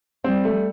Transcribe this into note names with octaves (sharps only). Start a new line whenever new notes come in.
G3 C4
A3